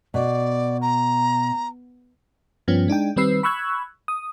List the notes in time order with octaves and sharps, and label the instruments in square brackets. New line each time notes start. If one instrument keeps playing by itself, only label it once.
[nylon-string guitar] B2 [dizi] D5
[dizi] A#5
[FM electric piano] G2 F3 B3 C#4
G#3 D4 D#4 G5
D#3 G3 C4 B4 E6 C7
B5 C#6 E6 F#6 G#6
D#6